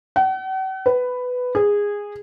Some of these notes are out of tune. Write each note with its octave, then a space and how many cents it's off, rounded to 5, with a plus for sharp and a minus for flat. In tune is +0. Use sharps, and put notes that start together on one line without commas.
F#5 +45
B4 +10
G#4 -15